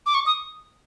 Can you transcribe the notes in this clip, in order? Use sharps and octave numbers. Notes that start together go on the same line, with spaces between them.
D6
C#6
D#6